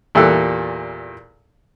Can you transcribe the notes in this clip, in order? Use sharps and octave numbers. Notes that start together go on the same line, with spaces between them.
E2 A#2 G3 A4 E6 F#6